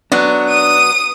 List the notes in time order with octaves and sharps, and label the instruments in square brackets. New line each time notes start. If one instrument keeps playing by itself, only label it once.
[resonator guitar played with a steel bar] F#3 B3 [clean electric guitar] D4
[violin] D#6 D#7